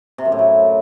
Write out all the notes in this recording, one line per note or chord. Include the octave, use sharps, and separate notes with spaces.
C3
F#2
A2
F#3